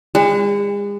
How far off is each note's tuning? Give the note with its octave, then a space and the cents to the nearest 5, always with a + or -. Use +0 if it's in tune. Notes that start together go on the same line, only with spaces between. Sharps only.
G#3 -40